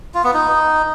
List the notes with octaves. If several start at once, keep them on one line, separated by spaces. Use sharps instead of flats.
F4
B3
D#4